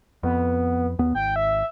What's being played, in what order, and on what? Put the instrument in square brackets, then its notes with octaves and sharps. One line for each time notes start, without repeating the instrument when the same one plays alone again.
[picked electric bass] F2 [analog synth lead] B3
[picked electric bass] D#2 B3
[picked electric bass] G#1 [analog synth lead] G5
[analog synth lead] E5